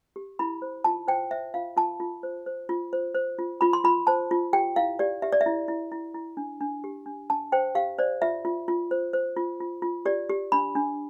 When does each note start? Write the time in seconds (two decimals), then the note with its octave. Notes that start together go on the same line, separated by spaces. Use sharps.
0.16 G4
0.39 E4 B5
0.62 C5
0.84 F4 A5
1.07 C5 G5
1.31 C5 E5
1.54 F4 F5
1.77 F4 A5
2.00 F4
2.23 C5
2.46 C5
2.69 F4
2.93 C5
3.15 C5
3.39 F4
3.61 F4 B5
3.73 C6
3.84 F4 B5
4.07 C5 A5
4.31 F4
4.53 G4 G5
4.76 E4 F5
4.99 G4 D5
5.22 G4 E5
5.32 D5
5.41 E5
5.46 E4
5.68 E4
5.92 E4
6.15 E4
6.37 D4
6.61 D4
6.84 G4
7.06 D4
7.30 D4 A5
7.52 C5 G5
7.75 G4 F5
7.98 C5 D5
8.22 F4 E5
8.45 F4
8.68 F4
8.91 C5
9.13 C5
9.37 F4
9.60 F4
9.82 F4
10.06 G4 D5
10.29 G4
10.52 D4 B5
10.76 D4